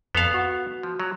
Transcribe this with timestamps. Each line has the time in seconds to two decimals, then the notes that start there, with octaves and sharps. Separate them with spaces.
0.15 F2 B3 A4 F5
0.34 F#4
0.83 F3
1.00 F#3